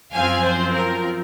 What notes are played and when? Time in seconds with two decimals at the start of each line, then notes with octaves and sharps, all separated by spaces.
0.13 F#2 F3 C4 F4 F5 G#5
0.44 C5
0.74 A#4